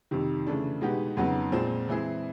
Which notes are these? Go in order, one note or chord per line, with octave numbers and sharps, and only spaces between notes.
F2 C3 D#3
C#3 E3 A3 D4
B2 G#3 B3 D#4 G4
F2 C#3 F#3 B3 D#4
A#2 F3 G#3 C4
E3 G#3 C4 E4 G#4